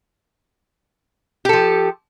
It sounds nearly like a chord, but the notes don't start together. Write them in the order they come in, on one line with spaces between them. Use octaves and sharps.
G4 A4 F3